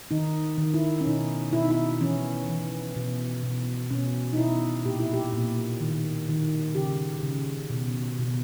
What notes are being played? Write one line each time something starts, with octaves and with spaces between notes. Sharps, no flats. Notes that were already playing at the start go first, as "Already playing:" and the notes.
D#3 D#4
D#3
E4
C#4
B2 D#4
B2 E4
D#4
E4
E3 C#4
E3
B2
B2
B2 C#4
D#4
B2 E4
A#2 G4
E4
G4
A#2
D#3
D#3
C#3 G4
C#3
B2
B2